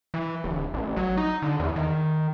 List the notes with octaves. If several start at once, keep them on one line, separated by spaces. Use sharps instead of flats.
E3
D1
A1
F#3
D#4
D3
E2
D#3